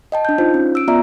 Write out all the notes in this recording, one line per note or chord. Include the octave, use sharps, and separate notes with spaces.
D#5 G5 A5
D4 G6
D#4 F4 C5
C#4
E6 D7
B3 F4 D5 E5 A#5